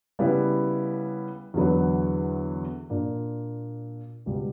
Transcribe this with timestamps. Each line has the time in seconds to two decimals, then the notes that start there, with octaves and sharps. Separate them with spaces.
0.19 C#3 G3 B3 E4
1.54 E2 D3 F#3 B3
2.90 A#2 A#3 D4
4.26 C#2 B2 G3